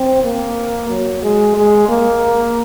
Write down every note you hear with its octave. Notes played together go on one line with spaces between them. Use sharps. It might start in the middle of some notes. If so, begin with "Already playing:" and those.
Already playing: C4
A#3
F#3
G#3
G#3
A#3